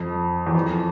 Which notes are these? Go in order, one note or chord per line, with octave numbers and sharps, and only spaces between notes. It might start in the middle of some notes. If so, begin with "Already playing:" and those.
Already playing: F2
E2
F2